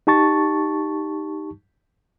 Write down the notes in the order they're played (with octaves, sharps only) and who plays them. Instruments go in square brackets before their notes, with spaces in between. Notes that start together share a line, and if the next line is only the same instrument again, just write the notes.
[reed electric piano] D#4 G4 A5 C#6 A6